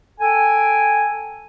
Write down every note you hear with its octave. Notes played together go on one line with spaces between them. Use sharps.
A4 G5 G#5